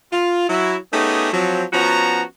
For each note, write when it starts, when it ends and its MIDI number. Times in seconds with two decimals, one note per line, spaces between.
0.12 0.48 65
0.49 0.76 54
0.49 0.76 64
0.92 1.29 57
0.92 1.29 59
0.92 1.29 61
0.92 1.29 63
0.92 1.29 67
0.92 1.29 68
1.33 1.64 53
1.33 1.64 54
1.33 1.64 60
1.73 2.23 53
1.73 2.23 59
1.73 2.23 61
1.73 2.23 66
1.73 2.23 82